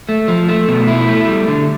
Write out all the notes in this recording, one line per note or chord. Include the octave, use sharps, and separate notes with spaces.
A3
F3
A3
B2
E4
A3
G3
D3